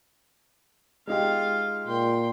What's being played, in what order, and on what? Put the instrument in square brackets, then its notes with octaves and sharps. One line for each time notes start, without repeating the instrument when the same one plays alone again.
[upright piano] G#3 D#4 G4 [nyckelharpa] F4 F5
[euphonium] A#2 [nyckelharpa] G5 C6